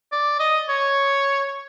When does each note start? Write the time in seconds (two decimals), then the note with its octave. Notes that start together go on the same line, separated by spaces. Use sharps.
0.12 D5
0.39 D#5
0.69 C#5